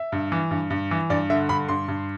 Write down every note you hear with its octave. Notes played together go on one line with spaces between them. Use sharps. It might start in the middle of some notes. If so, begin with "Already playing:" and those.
Already playing: E5
G2
E3
G2
G2
E3
G2 D5
D3 E5
G2 B5
G2 C6
G2